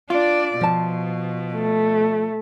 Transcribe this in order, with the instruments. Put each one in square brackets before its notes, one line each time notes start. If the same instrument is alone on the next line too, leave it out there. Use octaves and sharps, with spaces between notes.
[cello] D4 D5 [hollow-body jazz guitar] F4
[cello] B2 [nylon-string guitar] F3 F5 A5
[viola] A3